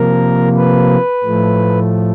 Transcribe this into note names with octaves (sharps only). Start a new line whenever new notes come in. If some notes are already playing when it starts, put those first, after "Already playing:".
Already playing: C3 F3 A#3 A#4
B4
A2 F3 A3